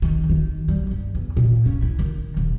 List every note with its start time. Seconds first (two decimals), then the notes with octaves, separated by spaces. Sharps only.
0.02 D#3
0.30 D#3
0.68 G3
0.91 G2
1.15 E2
1.37 A#2
1.66 C#4
1.82 E4
1.99 D#3
2.37 D#1